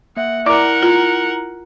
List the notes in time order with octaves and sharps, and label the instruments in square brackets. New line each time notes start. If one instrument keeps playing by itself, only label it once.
[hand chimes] A#3 E5 [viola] F#5
[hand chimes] E4 A#5 [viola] A#4 F#5 [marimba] D5 D6
[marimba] F4